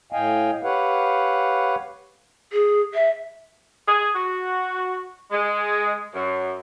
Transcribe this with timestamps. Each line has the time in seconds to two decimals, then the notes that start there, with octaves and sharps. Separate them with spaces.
0.13 A2 D#5 F5 G5 G#5
0.63 G4 B4 C#5 F5 F#5
2.52 G#4
2.94 E5
3.86 G#4
4.14 F#4
5.31 G#3
6.13 F#2